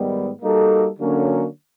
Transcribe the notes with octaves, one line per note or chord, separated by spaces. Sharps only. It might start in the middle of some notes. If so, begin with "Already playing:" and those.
Already playing: G#2 D#3 G3 B3
G3 A#3 D#4 F#4 A4
D3 F#3 A#3 C#4